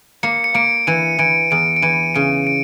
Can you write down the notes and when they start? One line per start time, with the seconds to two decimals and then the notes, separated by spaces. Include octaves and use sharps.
0.23 A#3 C#7
0.44 C#7
0.54 A#3 D7
0.87 E3 D#7
1.19 E3 D7
1.51 E2 D7
1.76 D7
1.82 E3 D#7
2.15 C#3 D7
2.47 D7